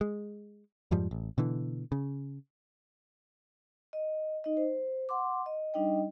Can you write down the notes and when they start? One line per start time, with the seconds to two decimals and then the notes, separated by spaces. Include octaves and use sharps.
0.01 G#3
0.91 F2 G#2 F3 G3
1.11 A1
1.38 B2 D3 E3
1.92 C#3
3.93 D#5
4.44 D#4 D#5
4.57 C5
5.09 F#5 C6 D6
5.46 D#5
5.74 G3 D4 D#4 D#5 G5